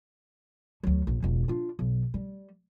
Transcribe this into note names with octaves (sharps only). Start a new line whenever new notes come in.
D2 F#3
A#1
E1 C#2
D4 F4
B1
G3